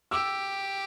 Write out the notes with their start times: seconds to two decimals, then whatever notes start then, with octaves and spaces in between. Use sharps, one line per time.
0.11 G4 D6 E6